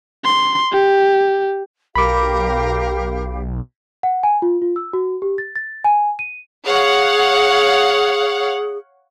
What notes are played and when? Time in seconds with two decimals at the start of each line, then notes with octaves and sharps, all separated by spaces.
0.24 C6
0.72 G4
1.95 B1 G4 A#4 F5 B5 D6
4.03 F#5
4.23 G#5
4.42 F4
4.62 F4
4.76 E6
4.93 F#4
5.22 G4
5.38 A6
5.56 A6
5.84 G#5
6.19 D#7
6.66 G#4 C#5 F5 F#5